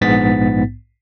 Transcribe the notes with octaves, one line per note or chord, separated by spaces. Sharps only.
A#1 G#2 B3 A6 B6